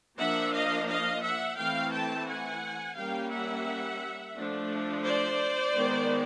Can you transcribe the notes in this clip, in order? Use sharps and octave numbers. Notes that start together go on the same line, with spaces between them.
F3 A#3 D4 E5 F#5
D#5 F5
D#5 F5
E5 F#5
E3 A3 C4 F5 G5
G5 A5
F#5 G#5
G3 A#3 C#4 F5 G5
E5 F#5
F3 A3 D4
C5 D5
D#3 G#3 B3